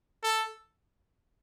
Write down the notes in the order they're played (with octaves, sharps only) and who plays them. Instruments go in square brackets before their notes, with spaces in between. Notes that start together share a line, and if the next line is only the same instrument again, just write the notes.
[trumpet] A4